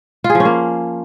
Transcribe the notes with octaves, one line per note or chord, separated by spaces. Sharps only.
F4
G#4
F3
C#4
A#3